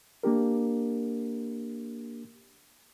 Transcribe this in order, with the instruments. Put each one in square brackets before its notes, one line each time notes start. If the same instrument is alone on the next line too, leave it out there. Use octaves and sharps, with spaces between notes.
[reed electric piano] A#3 D4 G4 A#4